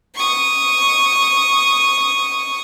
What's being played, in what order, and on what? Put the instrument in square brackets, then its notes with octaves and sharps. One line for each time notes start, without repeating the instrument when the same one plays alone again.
[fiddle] C#6 D#6